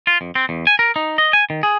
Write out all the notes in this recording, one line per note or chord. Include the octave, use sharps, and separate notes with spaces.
F4
F2
C4
E2
G#5
A#4
D#4
D#5
G#5
D#3
G#4